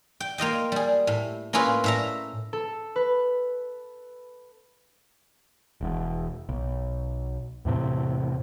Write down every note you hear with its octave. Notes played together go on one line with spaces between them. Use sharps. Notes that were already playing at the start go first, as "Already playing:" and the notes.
G5
A#3 F4 D#5 G5
G3 G#4
A2
A#3 C#4 E4 F4 G#4 B4
A2 E5 A#5
A4
B4
E1 E2
B1
E2 A2 C3